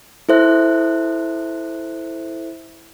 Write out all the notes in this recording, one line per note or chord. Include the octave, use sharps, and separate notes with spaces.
E4 A4 C5 E5 F#6